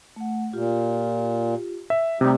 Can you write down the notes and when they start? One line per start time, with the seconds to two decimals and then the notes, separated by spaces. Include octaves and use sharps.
0.16 A3 F#5
0.53 A#2 F4 G4
1.90 E5
2.21 C3 G3 A3 D#4 G4 D5